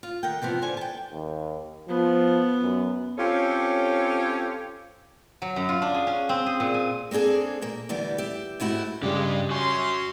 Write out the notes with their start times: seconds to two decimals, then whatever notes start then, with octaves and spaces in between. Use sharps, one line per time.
0.03 F4
0.23 D#3 A#4 F#5 G5
0.42 C3 E3 F3 B3
0.62 D3 C5 G#5
0.77 G5 A5
1.11 D#2
1.89 F3 B3
2.62 F#2
3.18 C4 C#4 F4 G4 A4 C#5
5.42 F#3
5.56 F#2
5.69 F4
5.82 D4
5.94 G#4
6.07 C#4
6.29 C4
6.46 G#4
6.60 A#2
6.74 G#5
7.11 A#3 C4 D4 G#4 A4
7.62 A#2 A#3
7.89 D2 E3 G3 B3
8.18 G4 E5
8.60 G#2 A3 E4 F#4 G4
9.02 G2 C#3 G3 G#3 G4
9.51 C#4 F#4 G#5 C6